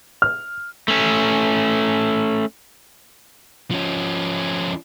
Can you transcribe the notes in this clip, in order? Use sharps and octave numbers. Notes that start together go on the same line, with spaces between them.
F6
A3 C#4
F3 C#4